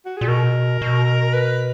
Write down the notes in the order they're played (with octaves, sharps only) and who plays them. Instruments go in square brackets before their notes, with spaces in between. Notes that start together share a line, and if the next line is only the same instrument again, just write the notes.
[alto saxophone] F#4
[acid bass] A#2 [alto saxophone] G#4
[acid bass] B2 [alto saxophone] A#4
[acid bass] B2
[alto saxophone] B4